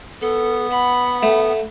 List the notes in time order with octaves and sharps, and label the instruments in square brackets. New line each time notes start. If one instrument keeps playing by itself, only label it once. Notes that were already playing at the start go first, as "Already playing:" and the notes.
[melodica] B3 [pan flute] A4
[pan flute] F#5 [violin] B5
[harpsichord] A3